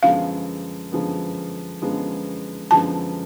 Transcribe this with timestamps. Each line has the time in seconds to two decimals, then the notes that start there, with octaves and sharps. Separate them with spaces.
0.03 F#2 D3 F3 G#3 B3 F5
0.92 F#2 D3 F3 G#3 B3
1.82 F#2 D3 F3 G#3 B3
2.71 F#2 D3 F3 G#3 B3 A5